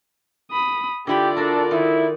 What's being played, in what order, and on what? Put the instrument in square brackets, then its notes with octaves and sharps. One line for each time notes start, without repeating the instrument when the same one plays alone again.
[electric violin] B5 D#6
[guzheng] D3 E4 B5 [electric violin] F4 D5 [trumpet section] G4
[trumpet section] D4 A4 [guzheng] F#4 A#4 A5
[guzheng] D#3 [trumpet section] E4